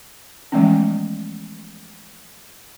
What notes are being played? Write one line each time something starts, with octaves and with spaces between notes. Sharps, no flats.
E3 F3 G#3 A3 B3 C#4